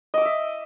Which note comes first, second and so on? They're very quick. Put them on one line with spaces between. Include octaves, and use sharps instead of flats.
D#5 D6 E6 E5